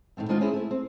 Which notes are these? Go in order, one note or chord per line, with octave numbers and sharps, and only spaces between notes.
A2 D#3 A3 C4
D#3 G#3 B3 C4 D4 F4
C4 C#4 D#4 E4 G#4 C5
A3 E4
C4